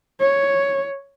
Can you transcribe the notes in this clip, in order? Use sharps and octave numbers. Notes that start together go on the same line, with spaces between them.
C#5